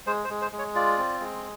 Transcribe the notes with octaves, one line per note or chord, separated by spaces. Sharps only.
G#3 C5
C5
G#3
C5
G#3
C#5
F4 D5
C4
G#3